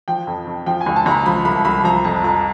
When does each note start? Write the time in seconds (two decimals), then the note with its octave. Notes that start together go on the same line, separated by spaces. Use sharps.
0.08 F3 G5
0.27 F2
0.47 F2
0.66 F3 G5
0.81 G#5
0.86 C#2
0.96 A5
1.06 C#2 A#5
1.11 B5
1.26 F3 B5
1.45 C2 B5
1.65 C2 B5
1.84 F3 A#5
2.04 F2 A5
2.24 F2 A#5